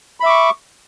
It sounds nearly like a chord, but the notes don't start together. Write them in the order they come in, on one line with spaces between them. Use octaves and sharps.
B5 E5 D6 C#6